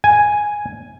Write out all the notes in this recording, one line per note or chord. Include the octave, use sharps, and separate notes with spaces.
G#5